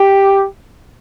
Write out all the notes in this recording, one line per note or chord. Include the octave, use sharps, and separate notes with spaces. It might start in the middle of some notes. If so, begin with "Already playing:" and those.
Already playing: G4